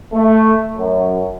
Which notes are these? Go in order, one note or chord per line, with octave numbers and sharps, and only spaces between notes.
A3
F#2